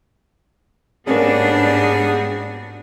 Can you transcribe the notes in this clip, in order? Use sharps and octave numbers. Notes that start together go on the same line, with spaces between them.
G#2 G3 A#3 B3 C#4 D4 F#4 G#4